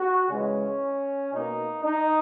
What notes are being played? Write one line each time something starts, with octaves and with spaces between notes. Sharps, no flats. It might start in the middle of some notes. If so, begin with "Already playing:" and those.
Already playing: F#4
C#3 E3 G#3 C#4
B2 A#3 D#4
D#4